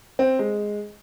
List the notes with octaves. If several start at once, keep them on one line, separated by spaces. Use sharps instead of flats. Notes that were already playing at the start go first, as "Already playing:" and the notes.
C4
G#3